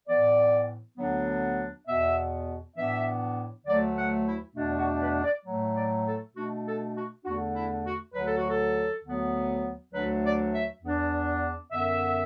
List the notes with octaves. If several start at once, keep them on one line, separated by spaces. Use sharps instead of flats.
A2 E3 B3 D5
D2 D3 F#3 B3 D4
E2 B2 B3 E5
A2 E3 B3 D4 E5
D2 D3 F#3 A3 D5
F#5
E4
E2 B2 A3 D4
F#4
B4
D5
A2 F#3 A3
D5
A4
B2 A3 D4 F#4
A4
F#4
E2 D3 A3 D4 F#4
E4
F#4
D2 D3 F#3 B4
A4
F#4
A4
D2 D3 F#3 B3
D2 D3 F#3 A3 D4 B4
D5
E5
E2 E3 B3 D4
F#2 D3 B3 E5